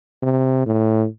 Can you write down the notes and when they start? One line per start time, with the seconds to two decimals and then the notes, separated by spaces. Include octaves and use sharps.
0.22 C3
0.66 A2